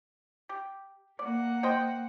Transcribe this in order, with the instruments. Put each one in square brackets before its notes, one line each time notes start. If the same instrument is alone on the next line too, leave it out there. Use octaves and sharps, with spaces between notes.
[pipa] G4
[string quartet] A#3 F#5 [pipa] D5
[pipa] C5 D#5 G5